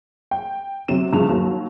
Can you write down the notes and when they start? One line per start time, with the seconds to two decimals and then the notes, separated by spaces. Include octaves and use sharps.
0.31 G5
0.88 C3 F#3 E7
1.13 G2 C#3 F3 F7
1.29 D#2 F#3